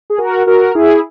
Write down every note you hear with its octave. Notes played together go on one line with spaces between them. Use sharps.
G#4
F#4 A#4
F#4 A#4
E4 G#4